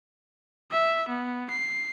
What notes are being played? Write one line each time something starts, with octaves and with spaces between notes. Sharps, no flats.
E5
B3
C7